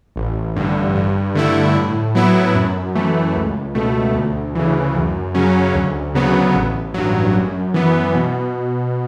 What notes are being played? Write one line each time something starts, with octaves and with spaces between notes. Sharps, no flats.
A1
G2 D3
G2
D3 A3 E4
A2
F#3 B3 E4
F#2
E3 A3
C#2
B2 A3
D2
C#3 E3
F#2
C#3 F#3 C#4
D2
C#3 F#3 B3
A1
G2 F#3
F#2
E3 B3
B2